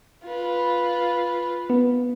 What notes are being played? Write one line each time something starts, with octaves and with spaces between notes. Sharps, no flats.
F4 B4
B3